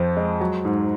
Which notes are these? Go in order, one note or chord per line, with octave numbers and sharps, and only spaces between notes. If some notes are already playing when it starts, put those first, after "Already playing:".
Already playing: F2 F3
G#3
F#3
G#2